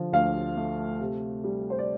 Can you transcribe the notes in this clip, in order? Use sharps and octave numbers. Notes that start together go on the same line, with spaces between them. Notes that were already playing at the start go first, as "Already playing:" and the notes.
Already playing: D3 F3
D2 F5
A3
C3
G3
C5
D5